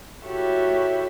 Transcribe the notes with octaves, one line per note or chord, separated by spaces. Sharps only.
E4 F#4 G4 A4 C#5 E5